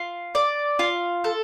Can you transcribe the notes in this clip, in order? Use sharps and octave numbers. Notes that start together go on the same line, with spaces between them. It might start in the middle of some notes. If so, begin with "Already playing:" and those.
Already playing: F4
D5
F4
A4